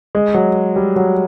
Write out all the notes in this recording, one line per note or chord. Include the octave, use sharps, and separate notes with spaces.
G#3
F#3
G3
F#3